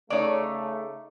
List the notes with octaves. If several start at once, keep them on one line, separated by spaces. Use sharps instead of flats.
C#3 A3 D#4 C#5 D5